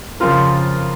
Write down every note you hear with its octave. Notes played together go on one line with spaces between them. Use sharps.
C#3 F3 C4 F4 A#4